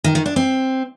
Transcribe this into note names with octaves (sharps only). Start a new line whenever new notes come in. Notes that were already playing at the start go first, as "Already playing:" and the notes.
D#3
D#3
D4
C4